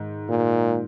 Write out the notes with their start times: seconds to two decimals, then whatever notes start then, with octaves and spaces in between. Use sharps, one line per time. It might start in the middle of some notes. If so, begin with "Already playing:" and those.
Already playing: G#2 D#3
0.29 A#2